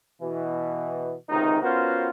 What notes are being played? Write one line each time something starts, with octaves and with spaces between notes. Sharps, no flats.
B2 E3
C#2 C3 D#3 D#4
B3 C#4 F4 F#4 A#4 C5